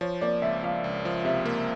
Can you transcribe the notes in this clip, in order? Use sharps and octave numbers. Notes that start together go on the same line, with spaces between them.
F3 C#5
A#3 D5
C#2 E5
F3 F5
C#2
F3
C3 E5
A#3